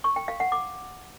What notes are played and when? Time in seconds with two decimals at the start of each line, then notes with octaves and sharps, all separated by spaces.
0.04 C#6
0.16 G5
0.28 F5
0.40 F#5
0.52 D6